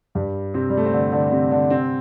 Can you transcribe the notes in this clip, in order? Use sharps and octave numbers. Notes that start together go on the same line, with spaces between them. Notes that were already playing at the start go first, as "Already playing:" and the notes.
G2 G3
C3 C4
G3
A3
C4
D3 D4
D3 D4
C3 C4
D3 D4
C3 C4